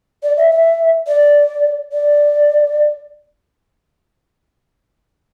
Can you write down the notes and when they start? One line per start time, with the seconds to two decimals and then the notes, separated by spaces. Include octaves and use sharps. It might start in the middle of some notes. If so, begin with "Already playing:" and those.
0.23 D5
0.37 E5
0.51 E5
1.07 D5
1.93 D5